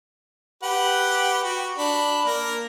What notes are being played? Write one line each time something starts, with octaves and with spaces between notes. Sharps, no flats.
G4 B4 F#5
F#4
D4 B5
A#3 A#4